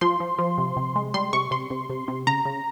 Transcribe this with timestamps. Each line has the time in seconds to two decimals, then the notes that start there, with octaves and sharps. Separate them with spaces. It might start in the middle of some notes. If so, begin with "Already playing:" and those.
0.01 F3 C6
0.20 F3
0.39 F3
0.58 C3
0.77 C3
0.96 G#3
1.14 G3 C6
1.33 C3 C#6
1.51 C3 C6
1.70 C3
1.90 C3
2.08 C3
2.27 C#3 A#5
2.45 C#3